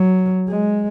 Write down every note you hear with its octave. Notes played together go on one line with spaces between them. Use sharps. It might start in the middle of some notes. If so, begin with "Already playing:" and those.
Already playing: F#3
G#3